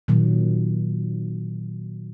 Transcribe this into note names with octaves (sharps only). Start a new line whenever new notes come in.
A#2 D#3 F#3